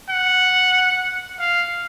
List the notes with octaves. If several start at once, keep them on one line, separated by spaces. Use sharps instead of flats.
F#5
F5